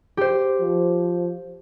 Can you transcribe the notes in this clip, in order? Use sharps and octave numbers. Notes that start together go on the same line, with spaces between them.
G4 C5
F3